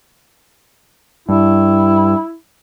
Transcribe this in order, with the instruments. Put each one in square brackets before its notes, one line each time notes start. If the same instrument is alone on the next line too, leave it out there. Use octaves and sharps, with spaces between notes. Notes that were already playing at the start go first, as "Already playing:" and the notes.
[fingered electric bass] G2 [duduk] E4